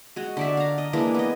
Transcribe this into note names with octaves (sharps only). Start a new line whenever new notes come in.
G#3 F#4
D3 D5 E5
F5 A#5
D#5
E3 G#3 A#3 D4
B3 D#5